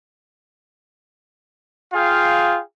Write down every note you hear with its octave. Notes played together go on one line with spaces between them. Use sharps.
F4 G#4 F5 G5